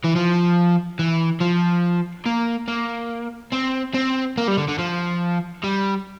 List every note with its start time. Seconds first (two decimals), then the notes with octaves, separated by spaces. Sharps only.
0.04 E3
0.15 F3
0.99 E3
1.41 F3
2.26 A#3
2.68 A#3
3.53 C4
3.95 C4
4.38 A#3
4.48 G3
4.58 D3
4.68 D3
4.79 F3
5.64 G3